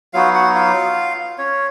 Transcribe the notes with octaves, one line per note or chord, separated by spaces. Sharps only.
F#3 B3 D#4 F4 F#4 F5
F#4 F#5
F4 F5
C#4 C#5